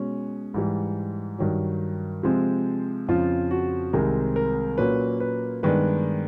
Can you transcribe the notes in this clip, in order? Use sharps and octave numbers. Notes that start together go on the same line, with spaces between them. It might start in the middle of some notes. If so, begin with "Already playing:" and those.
Already playing: B2 G#3 C#4
G#2 E3 G3
G2 D#3 F#3
C3 F3 G#3 C4
F2 C#3 F3 F4
F#4
C2 C3 D#3 G#3 C4 A#4
A#4
A#2 F#3 A#3 C#4 B4
B4
G2 D#3 G#3 B3 D4 B4